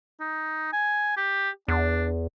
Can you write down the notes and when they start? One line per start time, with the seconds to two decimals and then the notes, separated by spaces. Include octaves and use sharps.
0.20 D#4
0.73 G#5
1.17 G4
1.68 E2 D4